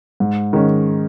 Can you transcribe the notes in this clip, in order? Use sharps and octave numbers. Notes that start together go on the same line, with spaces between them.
G#2
D#3 G#3 C#4